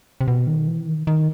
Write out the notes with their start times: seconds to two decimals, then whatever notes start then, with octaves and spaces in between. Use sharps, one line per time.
0.21 C3
0.28 B2
0.47 D#3
0.67 E3
0.87 D#3
1.07 D#3